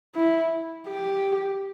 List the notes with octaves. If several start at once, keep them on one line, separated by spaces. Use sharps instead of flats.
E4
G4